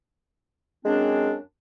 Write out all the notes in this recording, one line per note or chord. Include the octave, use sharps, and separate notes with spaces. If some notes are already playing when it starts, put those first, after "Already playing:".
F#2 G#3 C4 D4